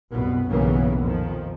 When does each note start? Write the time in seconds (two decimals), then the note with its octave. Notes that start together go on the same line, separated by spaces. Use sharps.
0.11 C2 F#2 B2 B3
0.49 B1 G2 C#3 E3 A#3 B3
1.01 F2 A#2 D#3 F3